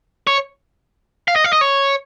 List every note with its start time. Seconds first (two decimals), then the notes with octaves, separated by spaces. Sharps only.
0.27 C#5
1.28 F5
1.36 D#5
1.44 F5
1.53 D#5
1.61 C#5